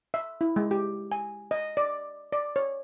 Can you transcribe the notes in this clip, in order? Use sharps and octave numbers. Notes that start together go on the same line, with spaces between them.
E5
E4
G#3
G4
G#5
D#5
D5
D5
C#5